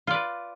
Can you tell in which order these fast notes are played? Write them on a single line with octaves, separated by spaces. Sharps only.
F4 D5 B4